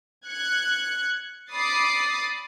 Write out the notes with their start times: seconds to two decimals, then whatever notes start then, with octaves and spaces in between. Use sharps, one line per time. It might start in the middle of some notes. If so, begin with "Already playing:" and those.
0.27 F#6 G#6 C#7
1.51 D5 B5 D6 D#6 A6 C7